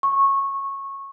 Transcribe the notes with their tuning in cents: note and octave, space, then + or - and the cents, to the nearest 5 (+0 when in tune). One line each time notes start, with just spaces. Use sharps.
C#6 -15